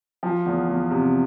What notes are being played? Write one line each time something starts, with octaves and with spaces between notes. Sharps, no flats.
F3
E2
E2
C3